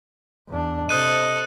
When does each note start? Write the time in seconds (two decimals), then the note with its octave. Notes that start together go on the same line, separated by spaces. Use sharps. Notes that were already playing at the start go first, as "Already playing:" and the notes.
0.49 E2 D4
0.89 C3 A4 C5 D#5 D#6 F#6 D#7